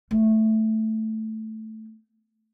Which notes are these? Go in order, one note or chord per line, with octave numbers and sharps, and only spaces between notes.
A3 B3